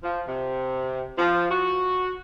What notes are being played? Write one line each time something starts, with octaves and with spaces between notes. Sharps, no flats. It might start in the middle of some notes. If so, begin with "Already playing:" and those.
F3
C3
F3
F#4